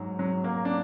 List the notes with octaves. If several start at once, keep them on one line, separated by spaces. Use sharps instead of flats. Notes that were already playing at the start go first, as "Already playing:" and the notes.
Already playing: G#2 F#3
F#3
F#3 A#3
D4